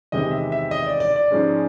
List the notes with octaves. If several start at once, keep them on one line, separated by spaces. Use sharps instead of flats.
E2 C3 D#3 G#3 C4 D#5
E5
E5
D#5
D5
D5
D5
G#2 F3 G#3 C#4